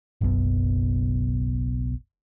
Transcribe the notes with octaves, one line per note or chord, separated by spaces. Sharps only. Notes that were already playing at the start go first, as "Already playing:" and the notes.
F#1 B1 F#2 B2